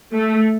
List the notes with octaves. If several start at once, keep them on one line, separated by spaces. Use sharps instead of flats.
A3